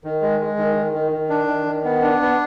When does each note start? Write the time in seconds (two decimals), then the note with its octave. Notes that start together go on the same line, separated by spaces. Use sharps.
0.04 D#3
0.22 G#3
0.40 G#3
0.57 D#3
0.76 D#3
0.93 D#3
1.12 D#3
1.30 D4
1.48 D#3
1.66 D#3
1.84 B3
2.02 D4
2.21 B3